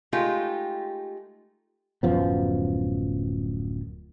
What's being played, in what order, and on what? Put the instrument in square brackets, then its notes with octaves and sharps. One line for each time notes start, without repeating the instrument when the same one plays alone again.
[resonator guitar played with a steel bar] G#3 A3 D#4 F4 G4
[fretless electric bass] D1 F#2 F3 B3